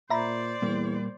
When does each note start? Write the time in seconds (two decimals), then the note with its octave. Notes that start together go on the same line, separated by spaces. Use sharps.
0.10 A#2 C5 D5 E5 A#5 B5
0.62 E2 A#2 G3 A#3